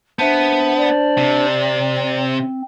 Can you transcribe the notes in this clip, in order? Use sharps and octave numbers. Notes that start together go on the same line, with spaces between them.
B3 D4 C5 E5 A5
D5
C3
C4